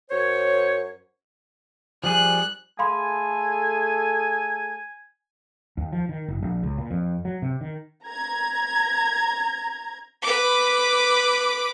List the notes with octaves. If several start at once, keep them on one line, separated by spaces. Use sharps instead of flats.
F#2 C5 C#5
F3 G3 G#4 F#6
A3 G#4 A4 F5 G#5 B5 C6
D#2
F3
D#3
F#1
A#1
C#2
A#2
F2
F#3
C3
D#3
A#5 G#6
B4 D6